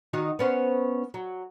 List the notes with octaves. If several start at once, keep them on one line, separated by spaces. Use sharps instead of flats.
D#3 D#4 F#4
B3 C#4 C5
F#3